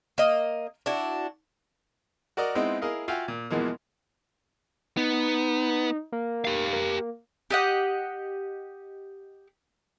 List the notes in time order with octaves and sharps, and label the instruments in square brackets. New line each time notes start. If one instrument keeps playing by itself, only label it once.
[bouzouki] A#3 D#5
D4 E4 F#4
[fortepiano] F#4 A#4 D5 D#5
G#3 B3 C4 D#4 E4
E4 G#4 A#4 D#5 F5
F4 F#4 E5 F5 G5 G#5
A#2
E2 B2 E3 F3 G#3 A#3
[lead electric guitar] B3 [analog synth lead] D#4
[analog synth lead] A#3
[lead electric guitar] G4 F5
[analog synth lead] A#3
[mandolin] G4 D#5 F#5